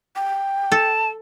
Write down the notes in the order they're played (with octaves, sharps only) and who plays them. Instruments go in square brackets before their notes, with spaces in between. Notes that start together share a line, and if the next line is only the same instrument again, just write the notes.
[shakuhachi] G5
[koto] A4 [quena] A5